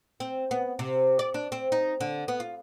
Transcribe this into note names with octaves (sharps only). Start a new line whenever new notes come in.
C4
B3
C3
D5
D4
C4
D#4
D3
B3
F4